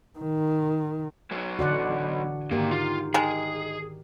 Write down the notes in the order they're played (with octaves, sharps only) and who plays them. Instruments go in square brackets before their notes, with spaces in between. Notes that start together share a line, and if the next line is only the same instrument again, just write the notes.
[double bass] D#3
[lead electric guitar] B1 F#3
[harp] A1 D3 C6 [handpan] F#4 D5 F#5
[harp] G#2 D#3 [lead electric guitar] C3 A#3 [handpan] G4 A#4
[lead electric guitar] F4 [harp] C#6
[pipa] D#3 G#3 [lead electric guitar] G#4